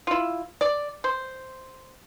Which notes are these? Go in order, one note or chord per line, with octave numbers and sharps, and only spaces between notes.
E4 F4
D5
C5